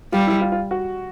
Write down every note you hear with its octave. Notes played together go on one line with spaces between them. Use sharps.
G3 F4
E4
F4
F4
F#4